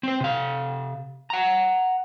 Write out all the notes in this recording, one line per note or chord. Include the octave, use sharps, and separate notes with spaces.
C4 C5
C3 F5
F#5 A#5